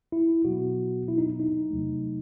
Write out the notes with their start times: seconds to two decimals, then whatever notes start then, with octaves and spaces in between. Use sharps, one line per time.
0.12 E4
0.45 B2 F#3 B3 F#4
1.08 E4
1.18 D#4
1.40 D#4
1.71 E2 C3 F#3 A3